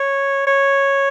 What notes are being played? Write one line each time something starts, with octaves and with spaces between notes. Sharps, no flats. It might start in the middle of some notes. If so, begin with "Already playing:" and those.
Already playing: C#5
C#5